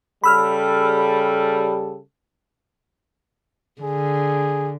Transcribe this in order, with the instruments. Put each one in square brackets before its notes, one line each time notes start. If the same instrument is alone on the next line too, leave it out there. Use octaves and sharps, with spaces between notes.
[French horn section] C#3 G3 A4 [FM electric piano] B5 E6 F6
[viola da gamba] D3 [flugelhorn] G#4